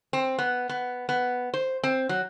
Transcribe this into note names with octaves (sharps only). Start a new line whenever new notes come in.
C4
B3
B3
B3
C5
C4
F#3